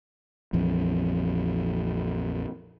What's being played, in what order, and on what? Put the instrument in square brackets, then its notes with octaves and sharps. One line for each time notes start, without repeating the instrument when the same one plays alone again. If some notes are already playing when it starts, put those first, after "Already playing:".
[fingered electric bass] A#1 F2 E3